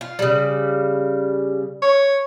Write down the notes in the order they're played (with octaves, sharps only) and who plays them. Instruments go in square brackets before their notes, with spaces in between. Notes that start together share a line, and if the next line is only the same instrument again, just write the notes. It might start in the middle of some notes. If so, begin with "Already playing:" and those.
[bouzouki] F4
C#3 G3
[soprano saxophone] C#5